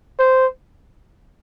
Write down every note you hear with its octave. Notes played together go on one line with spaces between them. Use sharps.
C5